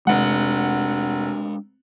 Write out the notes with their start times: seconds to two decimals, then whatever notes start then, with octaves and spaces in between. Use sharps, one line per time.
0.07 F1 G#3 D4 F#5